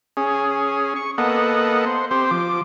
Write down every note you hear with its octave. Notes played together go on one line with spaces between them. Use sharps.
C#4 G#4
C#6
A#3 B3 A4 D#5 F#5
C5
C4 G4 C5
F3 D6